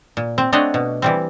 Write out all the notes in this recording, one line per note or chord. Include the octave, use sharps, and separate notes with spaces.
A#2
C4
A3 C4 D4 C#5 D#5 F#5
B2
E3 G3 C4